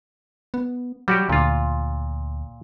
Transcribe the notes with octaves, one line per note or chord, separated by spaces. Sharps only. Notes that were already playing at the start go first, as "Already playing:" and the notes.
B3
F#3 G3 F#4 G4
D2 A#2 F4